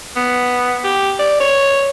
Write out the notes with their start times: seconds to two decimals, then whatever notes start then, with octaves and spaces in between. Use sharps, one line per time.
0.16 B3
0.84 G4
1.19 D5
1.40 C#5